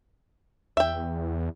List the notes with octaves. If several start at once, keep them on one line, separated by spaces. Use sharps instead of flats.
E2 E5 G5